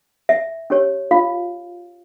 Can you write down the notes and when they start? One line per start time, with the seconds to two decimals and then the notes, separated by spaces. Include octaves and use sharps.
0.29 E5
0.70 C#4 G4 C#5
1.11 F4 F5